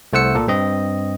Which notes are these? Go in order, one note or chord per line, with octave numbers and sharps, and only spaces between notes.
C2 A3 C5 F#5 E6 C#7
A#2 A4
G2 C4 D#5